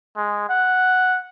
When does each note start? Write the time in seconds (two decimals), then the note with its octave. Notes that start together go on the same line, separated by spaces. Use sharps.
0.16 G#3
0.49 F#5